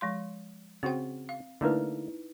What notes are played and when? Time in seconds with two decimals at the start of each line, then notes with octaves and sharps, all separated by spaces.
0.01 F3 G#3 C6
0.83 C#3 C4 F#4 C5 G5
1.29 F5
1.61 D3 A3 A#3 D#4 E4 B4